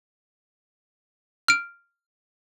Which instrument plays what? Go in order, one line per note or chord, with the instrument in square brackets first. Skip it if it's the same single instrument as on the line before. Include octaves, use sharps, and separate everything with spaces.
[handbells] F6 D7